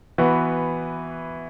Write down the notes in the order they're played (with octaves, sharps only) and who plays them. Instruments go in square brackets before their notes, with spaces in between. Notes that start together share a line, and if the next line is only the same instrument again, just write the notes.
[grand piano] E3 B3 F#4